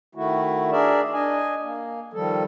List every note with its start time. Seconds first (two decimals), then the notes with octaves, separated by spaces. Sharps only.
0.15 D#3 A3 E4 F#4
0.71 D4 G#4 A#4 D5 E5
1.13 D4 D#5 G#5
1.63 A#3
2.13 D#3 F3 G3 A4